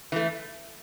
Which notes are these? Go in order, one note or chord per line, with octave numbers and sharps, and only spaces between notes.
E3 A3